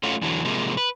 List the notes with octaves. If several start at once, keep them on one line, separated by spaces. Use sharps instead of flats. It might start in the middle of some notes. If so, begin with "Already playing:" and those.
A3 C#4 F4 F#4
E2 D3 E3 F#3
C3 F3 G#3 A#3
B4